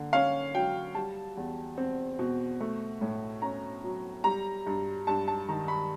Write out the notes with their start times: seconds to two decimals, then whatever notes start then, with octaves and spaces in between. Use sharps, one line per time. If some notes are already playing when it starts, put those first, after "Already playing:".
Already playing: D3 A#3
0.13 C#4 F5
0.55 F#3 G5
0.95 G3 A5
1.37 E2
1.78 C4
2.19 B2
2.61 A3
3.01 A2
3.42 C#4 A#5
3.84 F#3
4.24 G3 A#5
4.66 G2
5.07 G2 A5
5.28 A5
5.49 D#3 A#5
5.68 B5